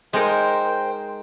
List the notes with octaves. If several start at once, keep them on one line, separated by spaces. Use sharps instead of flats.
G#3 D#4 A#4 C5 G5